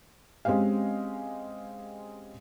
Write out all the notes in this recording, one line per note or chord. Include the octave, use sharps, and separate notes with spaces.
G#3 C4 C#4 G4 F5